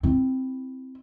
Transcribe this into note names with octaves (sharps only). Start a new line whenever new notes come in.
C4 E4